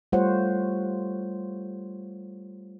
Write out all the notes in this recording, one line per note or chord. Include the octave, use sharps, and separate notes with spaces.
G3 A3 F4 C5 C#5 F#5